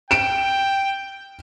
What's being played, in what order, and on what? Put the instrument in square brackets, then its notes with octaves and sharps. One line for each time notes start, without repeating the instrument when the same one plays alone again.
[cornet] G5 [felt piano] D7 E7